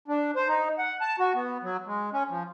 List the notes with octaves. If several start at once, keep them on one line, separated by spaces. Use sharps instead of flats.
D4
C5
D#4
F#5
A5
F#4
B3
F#3
G#3
C#4
F3